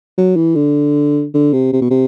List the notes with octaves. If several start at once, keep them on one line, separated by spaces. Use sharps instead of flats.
F#3
E3
D3
D3
C3
C3
B2
C3